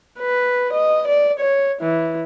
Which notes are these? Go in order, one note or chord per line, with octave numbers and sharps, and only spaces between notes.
B4
D#5
D5
C#5
E3